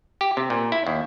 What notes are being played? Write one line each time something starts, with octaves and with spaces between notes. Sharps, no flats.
G4
C3
A#2
E4
D#2